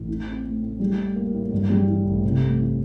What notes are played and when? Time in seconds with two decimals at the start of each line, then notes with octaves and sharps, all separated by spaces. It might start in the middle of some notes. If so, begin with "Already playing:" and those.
Already playing: A1
0.08 E3
0.26 C4
0.44 A3
0.62 A2
0.80 G3
0.98 A2
1.16 A#3
1.34 A2
1.52 G2
1.70 G3
1.88 E3
2.05 A1
2.24 C3
2.42 A3
2.59 E3